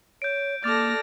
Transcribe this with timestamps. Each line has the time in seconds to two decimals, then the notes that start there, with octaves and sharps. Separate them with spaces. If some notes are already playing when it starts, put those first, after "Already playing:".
0.22 C#5 G6 D7
0.64 A#3 A4 D5 D6 F6 A6 A#6